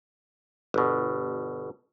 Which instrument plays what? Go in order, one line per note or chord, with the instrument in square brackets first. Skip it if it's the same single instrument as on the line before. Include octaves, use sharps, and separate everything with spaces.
[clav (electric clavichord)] G1 B2